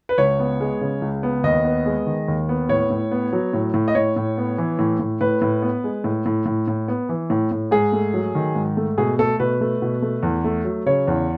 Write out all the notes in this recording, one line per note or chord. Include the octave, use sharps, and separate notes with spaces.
B4
C#2 C#5
B3
G#3
C#3
C#2
B3
D#2 D#5
B3
G#3
D#3
D#2
B3
A2 C#5
A2
B3
F#3
A2
A2
D#5
A2 C#5
A2
B3
E3
A2
A2
A2 B4
A2
B3
G#3
A2
A2
A2
A2
B3
E3
A2
A2
G#2 G#4
A3
F#3
D#3
G#2
A3
B2 G#4
A3 A4
B2 B4
A3
B2
A3
E2
A3
F#3
C#3 C#5
E2